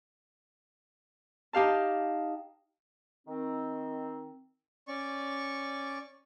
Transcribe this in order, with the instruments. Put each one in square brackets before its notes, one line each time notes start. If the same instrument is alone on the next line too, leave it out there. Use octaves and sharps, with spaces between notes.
[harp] D#4 G4 F5 A5
[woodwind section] D#3 C4
[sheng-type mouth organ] C#4 D5 C#6